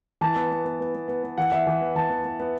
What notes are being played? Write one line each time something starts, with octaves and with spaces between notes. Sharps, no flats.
E3 A5
B3
B3
B3
B3
B3
B3
B3
E3 F#5
E3 E5
E3
B3
E3 A5
B3
B3
B3